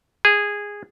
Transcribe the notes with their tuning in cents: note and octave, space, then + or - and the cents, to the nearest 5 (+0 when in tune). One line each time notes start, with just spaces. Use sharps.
G#4 -15